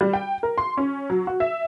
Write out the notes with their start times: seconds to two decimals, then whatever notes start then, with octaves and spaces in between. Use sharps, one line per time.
0.01 G3
0.13 G5
0.43 A#4
0.58 C6
0.77 C#4
1.10 F#3
1.27 F#4
1.40 E5